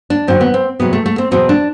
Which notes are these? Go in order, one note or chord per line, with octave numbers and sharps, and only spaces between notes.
D4
F#2 D3 F#3 C4
B3
C4
E2 C3 F#3 B3
A3
A3
C4
E2 B2 F#3 C4
D4